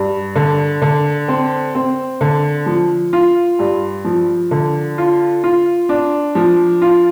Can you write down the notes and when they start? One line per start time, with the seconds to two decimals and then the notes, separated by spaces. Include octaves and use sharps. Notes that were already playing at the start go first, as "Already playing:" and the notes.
Already playing: G2
0.35 D3
0.82 D3
1.28 C4
1.75 C4
2.21 D3
2.66 F3
3.13 F4
3.59 G2
4.05 F3
4.51 D3
4.98 F4
5.44 F4
5.89 D4
6.35 F3
6.82 F4